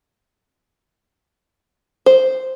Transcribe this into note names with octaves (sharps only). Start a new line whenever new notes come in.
C5